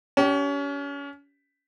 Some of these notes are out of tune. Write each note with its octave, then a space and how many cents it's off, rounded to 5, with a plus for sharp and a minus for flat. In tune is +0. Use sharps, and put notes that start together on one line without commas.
C#4 +30 G4 -20